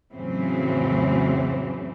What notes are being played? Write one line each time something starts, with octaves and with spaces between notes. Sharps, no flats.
F2 A2 C#3 E3 F#3 C4